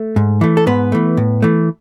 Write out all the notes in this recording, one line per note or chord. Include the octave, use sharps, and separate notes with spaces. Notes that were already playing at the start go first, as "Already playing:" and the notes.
Already playing: A3
G#2
E3 A3
A4
G#2 B3 B4
E3 A3
A2
E3 A3